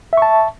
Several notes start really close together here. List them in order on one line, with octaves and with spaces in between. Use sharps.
E5 C#6 A5